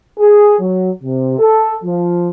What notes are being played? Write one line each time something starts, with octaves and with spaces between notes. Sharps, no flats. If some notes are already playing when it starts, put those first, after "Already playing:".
G#4
F#3
C3
A4
F3